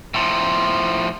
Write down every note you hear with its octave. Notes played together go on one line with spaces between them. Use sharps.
A2 F3